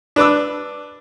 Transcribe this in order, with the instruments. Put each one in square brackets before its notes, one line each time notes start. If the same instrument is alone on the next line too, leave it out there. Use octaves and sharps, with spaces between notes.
[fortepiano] D4 B4 D6 E6